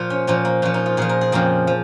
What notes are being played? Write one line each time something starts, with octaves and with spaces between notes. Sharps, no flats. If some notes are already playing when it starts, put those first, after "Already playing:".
Already playing: A#2 F3 F4
C#4
A#2 F3 C#4
A#3
A#2 F3 C#4
D#4
F4
A#2 F3 G#4
A#4
G#4
F2 C#3 F3 A#3
F3